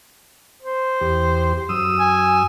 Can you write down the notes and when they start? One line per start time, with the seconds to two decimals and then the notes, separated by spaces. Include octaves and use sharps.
0.62 C5
1.01 E2 G4
1.69 F#2 D#6 E6
2.00 G#5